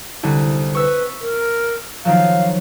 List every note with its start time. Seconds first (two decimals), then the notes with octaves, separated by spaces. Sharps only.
0.23 C2 D3
0.75 B4 C#6 E6 B6
1.22 A#4
2.05 D#3 F3 F#3 F5